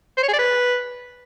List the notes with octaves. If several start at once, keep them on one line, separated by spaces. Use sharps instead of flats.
C5
C#5
G#4
D5
B4